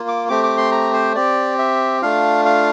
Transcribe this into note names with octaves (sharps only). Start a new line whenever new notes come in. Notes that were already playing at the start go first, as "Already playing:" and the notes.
Already playing: A#3 F4
D6
A3 C4 G4 D6
D6
C6
A#5
C5
C4 G4 D5
E5
A3 D4 F4 F5
F5